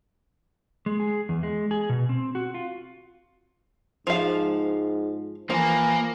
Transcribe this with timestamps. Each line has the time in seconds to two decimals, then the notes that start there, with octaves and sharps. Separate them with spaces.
0.86 G#3
1.00 G#4
1.29 E2
1.43 G#3
1.71 G#4
1.89 B2
2.09 C4
2.35 F#4
2.54 F4
4.07 G#2 F3 F5
5.50 E3 F3 A#3